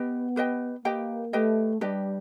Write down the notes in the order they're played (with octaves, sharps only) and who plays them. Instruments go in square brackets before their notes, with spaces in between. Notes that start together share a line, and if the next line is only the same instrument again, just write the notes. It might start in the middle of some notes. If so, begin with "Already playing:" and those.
Already playing: [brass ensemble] B3 [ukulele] G4 B4 D#5 G5
[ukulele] G4 B4 D#5 G5
[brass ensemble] A#3 [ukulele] G4 B4 D#5 G5
[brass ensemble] A3 [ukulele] G4 B4 D#5 G5
[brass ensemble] G3 [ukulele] D4 G4 B4 D#5